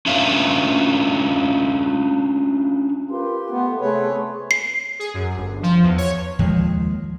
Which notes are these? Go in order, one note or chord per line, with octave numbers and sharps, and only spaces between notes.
C#4 D4 F4 B4 E5 F5
F4 G4 A#4 B4 C6
A3 B3
C3 A3 G#4 B4 C#5 C6 C#6
C7
G#4
F#2
G1
F3
E2
C#5
D#2 F3 G#3